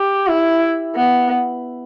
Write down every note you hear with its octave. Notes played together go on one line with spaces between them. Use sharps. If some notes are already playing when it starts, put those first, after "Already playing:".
Already playing: G4
E4
B3